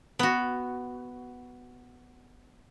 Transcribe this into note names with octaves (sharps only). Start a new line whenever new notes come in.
B3 F#4